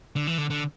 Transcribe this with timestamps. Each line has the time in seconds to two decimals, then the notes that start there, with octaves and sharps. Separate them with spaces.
0.16 D3
0.27 E3
0.38 D3
0.50 D3